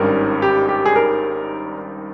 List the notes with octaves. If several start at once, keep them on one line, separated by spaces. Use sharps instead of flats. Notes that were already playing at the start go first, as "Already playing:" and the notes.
Already playing: G#1 G2 D#3 G3 C#4 A#4
G4
G4
G#4
A#4